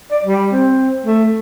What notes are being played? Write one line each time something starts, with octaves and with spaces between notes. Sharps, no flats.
D5
G3
C4
A3